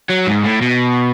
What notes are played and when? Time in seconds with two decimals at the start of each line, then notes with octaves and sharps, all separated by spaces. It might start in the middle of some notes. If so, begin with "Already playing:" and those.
0.10 F#3
0.27 G#2
0.45 A2
0.62 B2